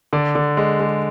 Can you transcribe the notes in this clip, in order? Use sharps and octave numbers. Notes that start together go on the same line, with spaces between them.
D3 D5
D3
G#3
G#3